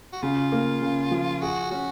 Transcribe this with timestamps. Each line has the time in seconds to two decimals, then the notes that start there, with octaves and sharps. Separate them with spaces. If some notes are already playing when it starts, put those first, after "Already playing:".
0.13 F#4
0.22 C#3 F4
0.52 A#3
0.81 C#3
1.11 F3
1.41 F#4 G#4
1.71 C#4 F#4